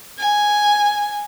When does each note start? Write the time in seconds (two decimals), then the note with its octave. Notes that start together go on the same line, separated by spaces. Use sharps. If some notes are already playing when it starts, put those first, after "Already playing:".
0.19 G#5